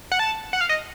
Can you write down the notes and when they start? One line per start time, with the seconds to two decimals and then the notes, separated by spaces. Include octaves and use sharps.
0.12 F#5
0.19 A5
0.53 F#5
0.61 F5
0.69 D#5